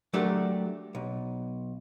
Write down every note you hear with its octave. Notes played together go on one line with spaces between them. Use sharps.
F#3 A3 D4 G4 A#4
B1